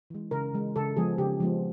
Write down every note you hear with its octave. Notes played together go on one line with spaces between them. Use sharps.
E3 G#3
C#3 A#4
E3 G#3
C#3 A4
F3 G#3 B3 G#4
C#3 G4
F3 G#3 B3